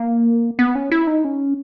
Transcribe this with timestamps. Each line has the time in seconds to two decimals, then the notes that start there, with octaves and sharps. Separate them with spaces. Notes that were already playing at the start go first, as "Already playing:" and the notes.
Already playing: A#3
0.59 B3
0.75 C#4
0.91 E4
1.07 D#4
1.25 C#4